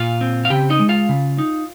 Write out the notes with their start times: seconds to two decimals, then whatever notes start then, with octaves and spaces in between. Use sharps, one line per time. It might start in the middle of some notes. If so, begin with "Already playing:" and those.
Already playing: A#2 F4 F5
0.21 C4
0.45 F5
0.50 C#3 G4 G5
0.70 D#4 D#5
0.79 G#3
0.89 F4 F5
1.09 C#3
1.38 D#4